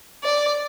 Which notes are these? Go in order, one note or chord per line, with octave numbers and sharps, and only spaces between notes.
D5